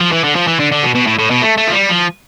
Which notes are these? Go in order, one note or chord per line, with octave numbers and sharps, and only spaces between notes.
F3
E3
D3
F3
E3
D3
D3
B2
B2
A2
A2
B2
A3
A3
F3
G3
F3